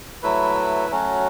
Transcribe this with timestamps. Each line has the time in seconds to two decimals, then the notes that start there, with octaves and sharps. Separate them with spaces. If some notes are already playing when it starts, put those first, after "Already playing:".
0.22 F#3 A3 E4 B4
0.91 F#3 A3 C#4 F#4